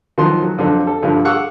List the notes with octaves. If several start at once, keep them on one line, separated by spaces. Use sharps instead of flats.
D#3 F3 F#3 C6
F#3
F2 D3 F#3 C4
A4
G2 D3 F3
F5 F#5 C#6 D6 E6